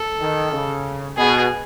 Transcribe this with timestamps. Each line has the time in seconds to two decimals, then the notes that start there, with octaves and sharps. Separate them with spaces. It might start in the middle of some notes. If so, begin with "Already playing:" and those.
Already playing: A4
0.21 D#3
0.53 C#3
1.17 B2 G#4